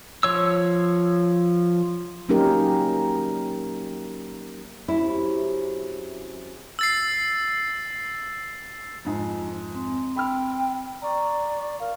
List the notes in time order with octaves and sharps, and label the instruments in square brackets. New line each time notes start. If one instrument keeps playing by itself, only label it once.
[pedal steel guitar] F3 C#5 E6
[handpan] F#3 A#3 C#4 D#4 G4 A#4
[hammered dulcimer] F#2 C3 G#4 [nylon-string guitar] E4
[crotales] E6 A6 C7
[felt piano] F2 G#2
[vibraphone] C4
[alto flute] G5 [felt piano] B5 E6 F6
[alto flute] D5 [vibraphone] A#5 C#6
[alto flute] A#4 [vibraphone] F5